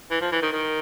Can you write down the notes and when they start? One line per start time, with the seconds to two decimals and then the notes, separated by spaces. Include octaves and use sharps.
0.11 E3
0.21 F3
0.32 E3
0.42 D#3
0.53 D#3